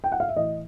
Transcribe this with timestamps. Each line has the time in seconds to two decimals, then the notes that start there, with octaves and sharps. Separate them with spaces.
0.04 G5
0.12 F#5
0.20 F5
0.28 E5
0.36 A2 E3 D#5